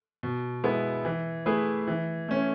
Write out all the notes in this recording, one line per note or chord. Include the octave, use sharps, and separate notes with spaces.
B2
G#3 B3 E4
E3
A3 E4 G#4 B4
E3
A3 C#4